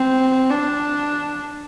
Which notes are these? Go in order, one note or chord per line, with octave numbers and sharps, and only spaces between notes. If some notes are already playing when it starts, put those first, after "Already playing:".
Already playing: C4
D4